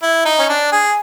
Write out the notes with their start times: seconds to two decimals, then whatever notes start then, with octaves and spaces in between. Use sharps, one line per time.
0.02 E4
0.25 D#4
0.39 C#4
0.49 D4
0.72 G#4